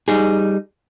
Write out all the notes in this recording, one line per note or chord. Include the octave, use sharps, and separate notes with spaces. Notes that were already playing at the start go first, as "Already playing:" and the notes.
G3 D#4 G#4